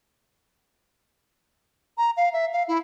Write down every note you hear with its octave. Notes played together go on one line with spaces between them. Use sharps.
A#5
F5
E5
F5
E4